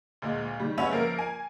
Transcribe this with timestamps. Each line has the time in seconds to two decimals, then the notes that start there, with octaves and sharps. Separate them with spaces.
0.22 D2 A#2 G#3
0.60 D#3 G3
0.77 G#3 B3 C#4 F#4 B4 E5
0.91 F3 A#3 A#4
1.19 G#5